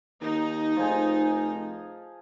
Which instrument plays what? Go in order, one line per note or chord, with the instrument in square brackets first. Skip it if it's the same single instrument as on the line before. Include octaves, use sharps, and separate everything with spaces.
[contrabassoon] D#2 [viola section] D#4
[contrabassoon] F1 [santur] F3 G#4